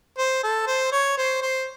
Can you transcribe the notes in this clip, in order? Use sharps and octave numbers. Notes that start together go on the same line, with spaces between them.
C5
A4
C5
C#5
C5
C5